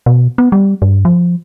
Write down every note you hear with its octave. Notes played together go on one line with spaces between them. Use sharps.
B2
B3
G3
G2
F3